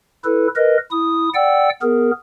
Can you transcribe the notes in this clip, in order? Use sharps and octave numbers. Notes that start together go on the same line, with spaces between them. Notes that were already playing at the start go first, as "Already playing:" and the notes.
E4 A4 B4
A#4 B4 D#5
E4 D#6
D5 F#5 G5 E6
B3 G#4 A#4